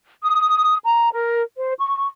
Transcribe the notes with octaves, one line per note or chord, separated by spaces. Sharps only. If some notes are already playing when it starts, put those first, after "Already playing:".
D#6
A#5
A#4
C5
C#6